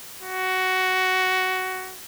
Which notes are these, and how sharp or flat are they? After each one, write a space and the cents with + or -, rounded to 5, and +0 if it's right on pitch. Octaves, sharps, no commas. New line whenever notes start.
F#4 +10